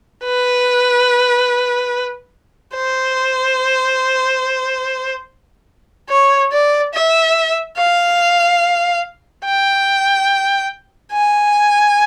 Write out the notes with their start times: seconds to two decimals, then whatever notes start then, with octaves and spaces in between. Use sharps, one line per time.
0.25 B4
2.75 C5
6.10 C#5
6.52 D5
6.93 E5
7.77 F5
9.44 G5
11.12 G#5